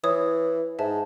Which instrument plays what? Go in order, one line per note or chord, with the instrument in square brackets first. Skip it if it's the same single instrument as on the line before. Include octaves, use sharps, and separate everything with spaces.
[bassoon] E3 [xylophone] C#5 D#6
[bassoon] G#2 [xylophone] E5 A5